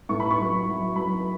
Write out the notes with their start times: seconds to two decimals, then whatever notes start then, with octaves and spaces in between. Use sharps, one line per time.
0.09 A2 C#6
0.20 B5
0.31 C#6
0.39 F#3
0.67 F#3
0.95 F#3 B5